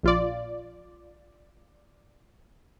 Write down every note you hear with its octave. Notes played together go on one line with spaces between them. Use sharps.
A#1 F4 D5